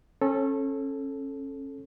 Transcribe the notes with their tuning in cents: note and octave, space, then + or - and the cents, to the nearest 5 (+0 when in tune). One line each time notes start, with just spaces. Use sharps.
C#4 -30 A4 -5